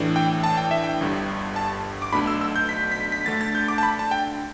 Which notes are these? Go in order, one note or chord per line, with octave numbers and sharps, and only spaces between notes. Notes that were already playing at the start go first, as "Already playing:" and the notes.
Already playing: A2 E3 A3 D4
G5
A5
G5
E5
G5
G1 G2 D3
A5
D6
B1 B2 A3 D4 B5
E6
E6
G6
B6
B6
B6
D2 D3 A3 D4 A6
A6
G6
D6
A5
B5
A5
G5